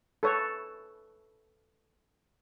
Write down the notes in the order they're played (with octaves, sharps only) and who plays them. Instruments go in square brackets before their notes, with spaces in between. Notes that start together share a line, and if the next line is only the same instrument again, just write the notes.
[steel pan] A4 B4 C#5